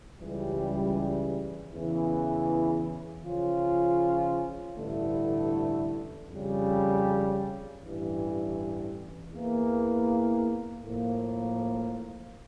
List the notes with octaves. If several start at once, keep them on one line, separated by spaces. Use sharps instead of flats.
C#2 C#3 E3 G3
E2 C#3 E3
C#3 F3 C#4 F4
A1 G2 D3 A3 E4
F2 C#3 G3
A1 G2 E3
E2 E3 A#3
A2 F3 A#3